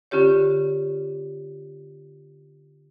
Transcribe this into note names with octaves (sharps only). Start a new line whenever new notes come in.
D3 C#4 F4 G4 C#5